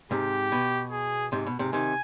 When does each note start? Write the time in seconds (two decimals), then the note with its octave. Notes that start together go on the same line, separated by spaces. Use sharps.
0.11 G#2 C3 G4
0.52 B2
0.92 G#4
1.32 G#2 C3
1.46 B2
1.59 G#2 C3
1.73 C3 D#3 G#5